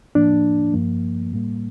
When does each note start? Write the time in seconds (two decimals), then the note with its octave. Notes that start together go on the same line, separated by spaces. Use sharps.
0.15 A2 F3 A#3 D4
0.74 G2 F3 A#3
1.32 A2 G3 A#3